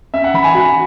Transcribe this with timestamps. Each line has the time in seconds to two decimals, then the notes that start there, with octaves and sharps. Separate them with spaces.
0.14 C#4 E5
0.24 F#5
0.34 E3 B5
0.44 G#5
0.54 F#4 F#5